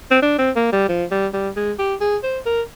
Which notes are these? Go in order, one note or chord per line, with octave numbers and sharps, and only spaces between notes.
C4
D4
C4
A#3
G3
F3
G3
G3
G#3
G4
G#4
C5
A#4